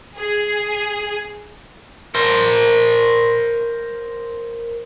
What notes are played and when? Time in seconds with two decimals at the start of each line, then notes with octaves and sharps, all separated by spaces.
0.17 G#4
2.15 A#4 C5